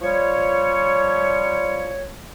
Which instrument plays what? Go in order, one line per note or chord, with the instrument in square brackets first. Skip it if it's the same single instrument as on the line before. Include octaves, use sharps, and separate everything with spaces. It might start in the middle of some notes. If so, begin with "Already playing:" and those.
[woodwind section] F3 G3 C#5